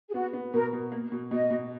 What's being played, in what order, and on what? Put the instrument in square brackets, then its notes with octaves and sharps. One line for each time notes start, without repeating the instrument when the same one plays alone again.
[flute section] G#4
[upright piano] B3 [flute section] F#4
[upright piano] B3
[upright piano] B2 [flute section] A#4
[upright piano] B2
A#3
B2
[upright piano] B2 [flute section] D#5
[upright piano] B2